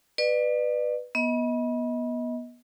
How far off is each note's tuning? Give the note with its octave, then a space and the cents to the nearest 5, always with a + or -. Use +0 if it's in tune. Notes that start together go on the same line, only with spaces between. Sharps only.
B4 +0 D5 +35
B3 -25 D#5 +30